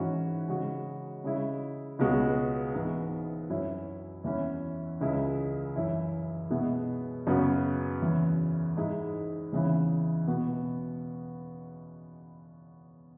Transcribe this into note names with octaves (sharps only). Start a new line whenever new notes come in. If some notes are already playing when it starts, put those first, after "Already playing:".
Already playing: G#2 E3 C#4 F#4
C#3 G#3 C#4 F#4
C#3 G#3 E4
C#2 B2 G#3 B3 F#4
G#2 E3 B3
F#2 F#3 C#4 E4
E2 E3 C#4 E4
C#2 C#3 G#3 E4
F#2 E3 C#4 E4
B2 G#3 B3 E4
F#2 C#3 F#3 B3 F#4
E2 C#3 E3
G#2 G#3 E4
E2 C#3 E3
B2 B3 F#4